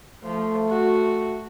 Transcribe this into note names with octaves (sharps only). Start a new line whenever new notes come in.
F3 A3
F#4